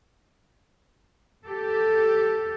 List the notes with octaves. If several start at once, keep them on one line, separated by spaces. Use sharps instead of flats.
G4 A4